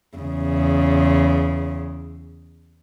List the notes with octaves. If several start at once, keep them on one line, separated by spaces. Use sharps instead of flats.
E2 C#3